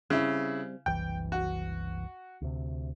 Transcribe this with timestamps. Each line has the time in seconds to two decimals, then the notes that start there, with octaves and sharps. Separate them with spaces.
0.10 C#3 G3 C4 E4
0.86 F#1 C2 E3 G5
1.32 F#4
2.42 D2 C3